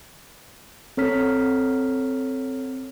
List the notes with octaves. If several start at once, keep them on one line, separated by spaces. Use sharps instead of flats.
C4 A4 C#5 A#5 F6 B6